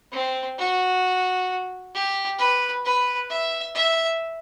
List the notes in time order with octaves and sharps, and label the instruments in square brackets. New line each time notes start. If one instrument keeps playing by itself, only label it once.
[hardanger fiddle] C4
F#4
G4
B4
B4
E5
E5